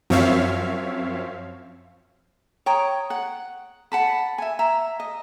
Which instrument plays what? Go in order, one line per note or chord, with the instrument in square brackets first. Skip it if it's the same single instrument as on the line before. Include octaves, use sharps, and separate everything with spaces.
[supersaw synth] F#2 F3 C4 C#5 E5 F5
[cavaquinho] C#5 G5 A#5 D#6
F#5
F#5 A5 B5
E5 G#5
E5 A#5
D#5